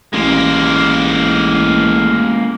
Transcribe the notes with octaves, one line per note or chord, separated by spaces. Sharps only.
A1 G#3 A#3